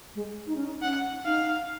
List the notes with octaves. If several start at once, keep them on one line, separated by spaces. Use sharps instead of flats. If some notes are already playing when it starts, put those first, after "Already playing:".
G#3
D#4
C#4
D#4
C#4 F#5
D#4 F5